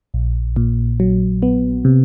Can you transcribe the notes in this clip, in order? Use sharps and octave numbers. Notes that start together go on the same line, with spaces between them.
A#1
A#2
F#3
B3
C3